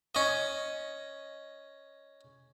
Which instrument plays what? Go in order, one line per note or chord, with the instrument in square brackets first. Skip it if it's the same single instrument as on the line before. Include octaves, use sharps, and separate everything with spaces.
[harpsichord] C#4 D#5